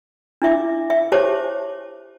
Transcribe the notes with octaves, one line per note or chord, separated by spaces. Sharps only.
D4 E4 E5 D6
E5
G4 C5 C#5 A5 D6